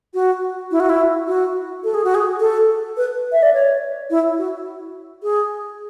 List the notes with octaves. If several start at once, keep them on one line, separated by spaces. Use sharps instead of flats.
F#4
E4
F#4
E4
F#4
A4
G#4
F#4
G#4
A4
B4
E5
D5
C#5
E4
F#4
G#4